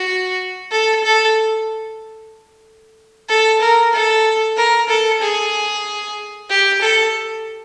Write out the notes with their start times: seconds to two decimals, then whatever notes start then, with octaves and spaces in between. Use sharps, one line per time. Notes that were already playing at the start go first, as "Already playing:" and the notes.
Already playing: F#4
0.71 A4
1.04 A4
3.29 A4
3.61 A#4
3.93 A4
4.57 A#4
4.89 A4
5.21 G#4
6.50 G4
6.81 A4